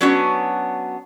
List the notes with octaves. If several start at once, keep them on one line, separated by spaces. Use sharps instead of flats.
F#3 B3 C#4 D4 F#4